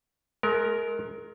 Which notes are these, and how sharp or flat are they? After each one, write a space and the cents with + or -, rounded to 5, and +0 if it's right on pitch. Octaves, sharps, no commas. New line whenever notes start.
G#3 +35 A#4 +0